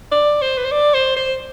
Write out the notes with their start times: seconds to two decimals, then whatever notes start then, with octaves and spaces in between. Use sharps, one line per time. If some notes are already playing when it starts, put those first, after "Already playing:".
0.12 D5
0.42 C5
0.57 B4
0.65 C5
0.71 D5
0.94 C5
1.16 C5